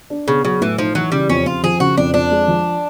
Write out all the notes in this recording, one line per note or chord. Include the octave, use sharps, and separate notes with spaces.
D4
C#3 B3
C#3 F#3
A2 E3
F3 D#4
E3 F#3
C#3 G3
F2 C#4
F2 F4
F3 G#4
C#3 F#4
F2 D4
F2 D4
G#3
F3